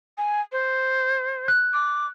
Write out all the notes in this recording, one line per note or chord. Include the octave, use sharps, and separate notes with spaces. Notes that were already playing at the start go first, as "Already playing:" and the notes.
G#5
C5
F#6
D6